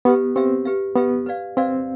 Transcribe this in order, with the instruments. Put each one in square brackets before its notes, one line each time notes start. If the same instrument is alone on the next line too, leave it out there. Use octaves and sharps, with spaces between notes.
[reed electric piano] B3 [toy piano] G4 B4 E5
[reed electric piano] C4 [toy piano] G4 B4 E5
[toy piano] G4 B4 E5
[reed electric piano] B3 [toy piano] G4 B4 E5
[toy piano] B4 D5 F5
[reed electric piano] C4 [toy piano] B4 D5 F5